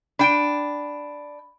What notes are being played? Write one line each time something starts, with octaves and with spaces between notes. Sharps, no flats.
D4 G5 B5 D7